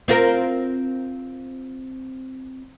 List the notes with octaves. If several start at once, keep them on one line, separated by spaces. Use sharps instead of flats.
C4 F4 A#4